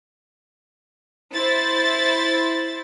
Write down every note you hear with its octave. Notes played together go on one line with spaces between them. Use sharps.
E4 C5 A6